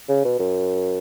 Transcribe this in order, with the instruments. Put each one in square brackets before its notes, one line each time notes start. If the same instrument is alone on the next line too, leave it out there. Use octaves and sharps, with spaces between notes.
[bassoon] C#3
B2
F#2